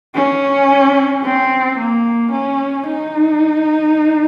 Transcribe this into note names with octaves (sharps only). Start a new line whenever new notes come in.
C#4
C4
A#3
C#4
D#4